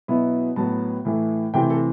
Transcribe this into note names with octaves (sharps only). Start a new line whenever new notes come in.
B2 F#3 B3 E4
A2 F#3 B3 A5
A2 E3 A3
C3 E3 A3 C4 G5
A4